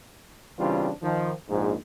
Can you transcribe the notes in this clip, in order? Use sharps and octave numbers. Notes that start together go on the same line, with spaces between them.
C#3 E3 G3 C4 D4 F4
D#3 F3
A#1 G#2